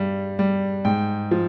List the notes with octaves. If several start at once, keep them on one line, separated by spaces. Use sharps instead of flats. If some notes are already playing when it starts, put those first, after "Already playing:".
Already playing: G2 G3
G3
G#2 G5
F3